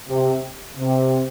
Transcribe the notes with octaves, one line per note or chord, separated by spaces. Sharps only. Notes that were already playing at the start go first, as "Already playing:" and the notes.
C3
C3